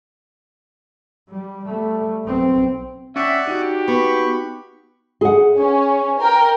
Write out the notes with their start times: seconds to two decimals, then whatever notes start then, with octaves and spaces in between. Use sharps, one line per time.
1.29 G3
1.66 G3 A3
2.25 B1 C4
3.16 C#4 D5 E5 F#5 G5
3.47 D#4 F#4 G4
3.88 B3 B5 C#6
5.21 G#4 F#5
5.57 C#4
6.21 A#4 G5